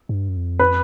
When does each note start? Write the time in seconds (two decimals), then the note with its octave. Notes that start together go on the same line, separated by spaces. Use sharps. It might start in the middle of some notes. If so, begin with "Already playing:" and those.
0.09 G#2
0.14 G2
0.29 F#2
0.37 F2
0.59 B4